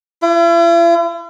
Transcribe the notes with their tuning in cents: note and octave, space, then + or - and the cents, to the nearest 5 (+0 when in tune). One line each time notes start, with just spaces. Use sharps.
E4 +45